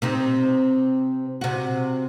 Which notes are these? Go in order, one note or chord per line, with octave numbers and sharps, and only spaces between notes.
C3 C4 D#4
C3 F#4